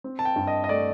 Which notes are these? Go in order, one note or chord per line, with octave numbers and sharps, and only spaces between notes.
C4
A5
G5
G2
D#5
D#5
A3 D5